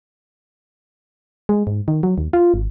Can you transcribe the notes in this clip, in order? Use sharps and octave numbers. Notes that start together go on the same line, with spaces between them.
G#3
G#2
D#3
F#3
D#2
F4
G#1